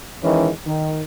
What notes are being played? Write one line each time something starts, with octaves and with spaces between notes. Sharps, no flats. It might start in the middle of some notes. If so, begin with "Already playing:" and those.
D#3 E3 G#3 C#4
D#3